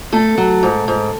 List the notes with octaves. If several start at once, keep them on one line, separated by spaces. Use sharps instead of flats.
A3 A4
F#3
G#2
G#2